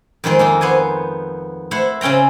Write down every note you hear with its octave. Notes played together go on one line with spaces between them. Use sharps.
F2 D#3 G#3 C4
A#3 D#4 A4
B3 C5 C#5 G#5
A3 E4 C5 E5 F#5
C#3 C4 C#4 G5 A#5